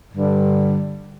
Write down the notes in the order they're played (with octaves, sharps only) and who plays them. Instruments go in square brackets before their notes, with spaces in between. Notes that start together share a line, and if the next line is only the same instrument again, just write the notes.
[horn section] G2 D3 G3